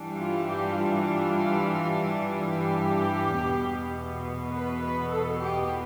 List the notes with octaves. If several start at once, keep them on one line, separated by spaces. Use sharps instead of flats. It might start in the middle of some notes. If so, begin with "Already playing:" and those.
Already playing: G2 E3 G3 D4
F4
G4
F4
G4
E2 B2 B3
B4
B4
A4
G4